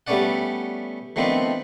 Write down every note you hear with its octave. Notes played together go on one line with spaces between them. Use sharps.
G3 A3 B3 C#4 D5 F#5
D#3 F3 A3 B3 C4 D4